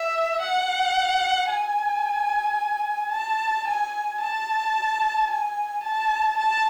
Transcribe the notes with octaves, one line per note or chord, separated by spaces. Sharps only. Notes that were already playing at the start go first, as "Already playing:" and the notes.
Already playing: E5
F#5
G#5
A5
G#5
A5
G#5
A5
A5